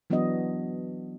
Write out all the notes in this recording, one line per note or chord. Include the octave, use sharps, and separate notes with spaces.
E3 F#3 B3 D4 F#4 D#5